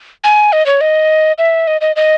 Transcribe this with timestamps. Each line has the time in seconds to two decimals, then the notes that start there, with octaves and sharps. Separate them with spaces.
0.24 G#5
0.53 D#5
0.66 C#5
0.81 D#5
1.38 E5
1.67 D#5
1.81 D#5
1.96 D#5